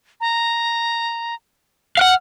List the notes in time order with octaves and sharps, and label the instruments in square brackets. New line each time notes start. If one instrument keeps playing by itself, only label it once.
[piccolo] A#5
[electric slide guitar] F5 F#5 [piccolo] F6